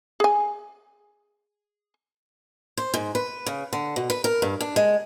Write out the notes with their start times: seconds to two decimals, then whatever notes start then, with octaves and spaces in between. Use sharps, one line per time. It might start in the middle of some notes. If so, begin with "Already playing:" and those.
0.20 G#4 G#5
2.77 C5
2.94 G#2
3.15 B4
3.46 C#3
3.73 D3
3.96 B2
4.10 B4
4.24 A#4
4.42 G2
4.61 D4
4.76 G#3